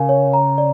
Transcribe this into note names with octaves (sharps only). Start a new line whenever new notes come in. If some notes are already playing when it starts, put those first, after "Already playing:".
Already playing: C#3 A#4 F5 G#5
C#5
A#5
D5